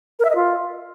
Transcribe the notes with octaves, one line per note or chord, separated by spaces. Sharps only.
A#4
E5
D#5
F4